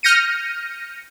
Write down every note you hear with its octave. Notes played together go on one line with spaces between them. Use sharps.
F6 G6 A#6 C#7 D#7